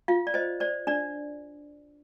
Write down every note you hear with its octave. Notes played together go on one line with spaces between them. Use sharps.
F4 F5
D5
C5 D#5
C5 D5
D4 D5